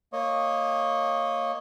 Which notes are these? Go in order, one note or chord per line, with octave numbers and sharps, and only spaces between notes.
A#3 C#5 D#5